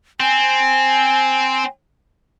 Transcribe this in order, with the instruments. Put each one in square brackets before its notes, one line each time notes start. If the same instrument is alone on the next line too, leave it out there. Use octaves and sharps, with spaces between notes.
[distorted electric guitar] C4 [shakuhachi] G#5